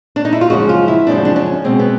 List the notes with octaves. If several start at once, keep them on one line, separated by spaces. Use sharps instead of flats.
D4
D#4
E4
F4
F#2 C#3 F3 G#3 F#4
F4
E4
F#2 C#3 F3 G#3 D4
D4
C#4
B2 G#3 C4
B3